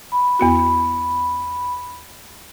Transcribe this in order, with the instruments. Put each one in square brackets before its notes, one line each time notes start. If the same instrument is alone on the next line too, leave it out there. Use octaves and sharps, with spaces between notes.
[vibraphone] B5
[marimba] E2 B3 F#4